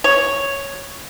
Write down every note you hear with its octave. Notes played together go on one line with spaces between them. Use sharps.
C#5